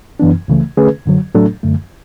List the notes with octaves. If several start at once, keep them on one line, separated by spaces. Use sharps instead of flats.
F#2 E3 B3 D4
C#2 C#3 E3 A3
D3 A3 C#4 G#4 B4
F#2 D3 F#3
A2 F#3 A3 D4 A4
F#2 D3 A3